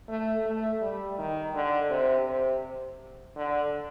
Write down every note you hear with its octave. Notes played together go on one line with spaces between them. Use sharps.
A3
A3
G3
D#3
D3
C3
C3
D3